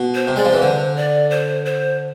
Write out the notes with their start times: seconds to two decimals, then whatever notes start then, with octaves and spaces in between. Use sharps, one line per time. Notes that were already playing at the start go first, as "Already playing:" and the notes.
Already playing: B2
0.15 C5
0.27 C3
0.36 G#3 D5
0.45 F3
0.53 E3 B4
0.61 D3 C5
0.97 D5
1.31 C5
1.66 C5